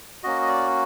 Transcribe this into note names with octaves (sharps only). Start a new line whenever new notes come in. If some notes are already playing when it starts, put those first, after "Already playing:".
A#3 C#4 F#4 D#5
D#5
D5